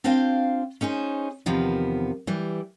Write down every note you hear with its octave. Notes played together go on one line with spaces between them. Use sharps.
C4 D4 F4 C5 F5 G5
C#4 D#4 G#4 C5
E2 C3 D#3 F3 B3
E3 G3